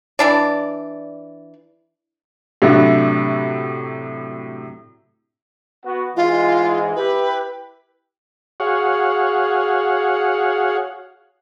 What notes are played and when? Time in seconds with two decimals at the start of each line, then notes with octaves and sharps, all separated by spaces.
0.19 E3 D4 D5
2.62 A2 C3 F#3 D4 E4 F#4
5.85 B3 F#4
6.16 G#2 E3 G#3 F4
6.96 E4 G4 B4
8.60 F#4 G#4 C#5 F5 F#5